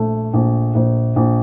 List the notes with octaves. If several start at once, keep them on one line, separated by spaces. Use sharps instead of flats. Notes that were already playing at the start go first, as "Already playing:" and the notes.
Already playing: A#1 A3
A#1
A#1
A#1